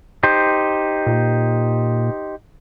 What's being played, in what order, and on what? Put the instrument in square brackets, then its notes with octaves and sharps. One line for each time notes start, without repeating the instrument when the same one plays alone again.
[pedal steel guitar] D#4 G4 C5
[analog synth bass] A#2